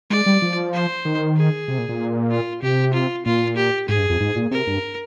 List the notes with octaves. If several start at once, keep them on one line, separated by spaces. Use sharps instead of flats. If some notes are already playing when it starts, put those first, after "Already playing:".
G#3 D5
G3
F3
C5
D#3
G#4
C3
A#2
A#2
F4
C3 G4
F4
A#2 F4
G4
G#2 G#4
G2
F2
G#2
A#2
C3 A#4
G2